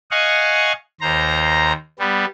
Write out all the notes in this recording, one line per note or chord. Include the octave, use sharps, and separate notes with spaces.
D#5 F5 F#5 G#5 C#6
D#2 C5 A#5
G3 B3